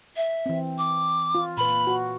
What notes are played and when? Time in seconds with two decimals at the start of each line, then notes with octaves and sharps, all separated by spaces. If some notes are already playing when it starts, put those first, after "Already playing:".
0.16 E5
0.46 E3 C4
0.78 D6
1.35 F4
1.57 A#2 B4 B5
1.87 F#4